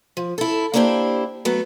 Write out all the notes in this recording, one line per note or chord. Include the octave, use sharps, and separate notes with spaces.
F3
E4 A4
A#3 B3 D4 E4 G4 C5
F#3 A3 B3